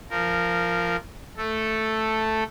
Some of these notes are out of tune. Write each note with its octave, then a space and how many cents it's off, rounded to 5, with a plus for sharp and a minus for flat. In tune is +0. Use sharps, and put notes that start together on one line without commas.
F3 -15 A#4 -10
A3 +0 A4 +0